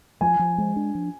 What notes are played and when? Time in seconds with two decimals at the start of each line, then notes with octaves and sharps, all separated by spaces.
0.21 F3 G#5
0.39 F3
0.58 G#3
0.76 D4
0.95 F3